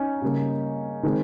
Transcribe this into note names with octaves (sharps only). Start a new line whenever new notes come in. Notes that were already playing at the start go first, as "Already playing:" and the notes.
Already playing: C#4 D#4
C#3 G3 A#3
D#3 G#3 C4